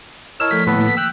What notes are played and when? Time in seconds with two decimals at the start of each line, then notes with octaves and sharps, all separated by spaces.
0.40 E4 A#4 C#5 D#5 A5 E6
0.51 F3 A3 A4 B6
0.67 A2 D3 D#3 A#3 B3 A4 B4
0.97 G5 E6 F#6